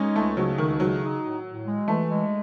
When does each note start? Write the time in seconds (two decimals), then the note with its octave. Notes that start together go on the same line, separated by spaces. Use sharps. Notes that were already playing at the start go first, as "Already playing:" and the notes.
Already playing: G#3 C#4 D#4
0.15 C#2 A3
0.37 C#3 F#3
0.58 C#2 D#3
0.80 C#3 F#3
1.02 D#4
1.23 A2
1.45 A2
1.65 G#3
1.88 E3 A3
2.09 G#3